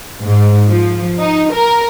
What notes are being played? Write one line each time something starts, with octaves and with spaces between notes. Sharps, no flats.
G#2
F3
D#4
A#4